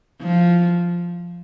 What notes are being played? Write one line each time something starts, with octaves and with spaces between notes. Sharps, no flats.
F3